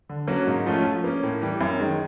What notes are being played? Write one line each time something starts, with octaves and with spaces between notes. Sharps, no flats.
D3
F#3 A#3 C#4 F#4
G#2
F3 A3 C#4 F4
F3
A#3 C#4
A2
E3 G3
F#2
D#3 G#3